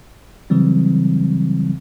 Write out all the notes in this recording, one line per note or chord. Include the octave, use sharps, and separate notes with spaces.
C#3 E3 F#3 G3 C4